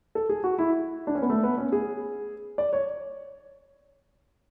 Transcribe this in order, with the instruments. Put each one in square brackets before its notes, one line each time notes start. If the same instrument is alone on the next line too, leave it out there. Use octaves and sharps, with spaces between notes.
[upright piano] A4
G#4
F#4
E4
D4
C#4
B3
A3
B3
C#4
G#4
D5
C#5